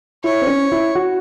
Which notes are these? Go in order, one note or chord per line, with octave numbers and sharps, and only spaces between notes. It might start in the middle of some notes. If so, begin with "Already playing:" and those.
E4 C#5
C4
C#4
E4
F#4